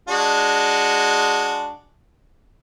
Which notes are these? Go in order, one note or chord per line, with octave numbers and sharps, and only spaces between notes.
G#3 D4 F#4